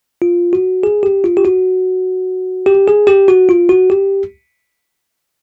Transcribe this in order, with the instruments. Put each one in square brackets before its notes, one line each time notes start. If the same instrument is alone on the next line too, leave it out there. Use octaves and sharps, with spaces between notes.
[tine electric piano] F4
F#4
G#4
G4
F4
G4
F#4
G4
G#4
G4
F#4
F4
F#4
G4